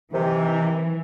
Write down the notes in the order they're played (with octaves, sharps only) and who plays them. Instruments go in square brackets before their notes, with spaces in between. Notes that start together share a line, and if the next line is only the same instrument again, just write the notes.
[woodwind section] C3 D#3 [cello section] E3